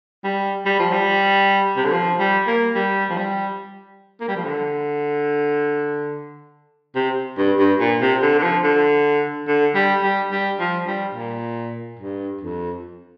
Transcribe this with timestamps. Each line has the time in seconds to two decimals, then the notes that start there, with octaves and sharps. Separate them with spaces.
0.24 G3
0.65 G3
0.79 F3
0.92 G3
1.76 C3
1.85 D3
1.92 F3
2.19 G3
2.47 A#3
2.75 G3
3.10 F3
3.17 G3
4.21 A#3
4.28 G3
4.36 F3
4.44 D3
6.95 C3
7.37 G2
7.59 G2
7.80 A#2
8.01 C3
8.22 D3
8.38 D3
8.43 F3
8.64 D3
9.47 D3
9.75 G3
10.03 G3
10.31 G3
10.59 F3
10.87 G3
11.14 A#2
11.99 G2
12.41 F2